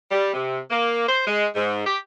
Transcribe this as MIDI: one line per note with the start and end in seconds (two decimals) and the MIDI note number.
0.11 0.33 55
0.34 0.60 48
0.70 1.04 58
1.08 1.26 72
1.27 1.46 56
1.56 1.85 44
1.86 1.98 67